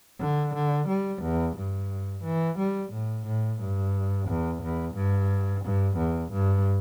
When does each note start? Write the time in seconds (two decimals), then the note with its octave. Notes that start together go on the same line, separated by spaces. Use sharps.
0.20 D3
0.54 D3
0.88 G3
1.22 E2
1.56 G2
2.24 E3
2.58 G3
2.92 A2
3.26 A2
3.60 G2
4.28 E2
4.62 E2
4.95 G2
5.64 G2
5.97 E2
6.32 G2